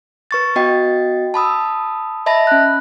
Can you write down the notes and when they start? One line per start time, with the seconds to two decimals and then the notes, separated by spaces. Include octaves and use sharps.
0.31 B4 C#6 A6
0.56 B3 F#4 D#5 G5 A6
1.34 A5 B5 D#6 E6
2.26 D#5 E5 A5 B5 A#6
2.47 C#4 F#6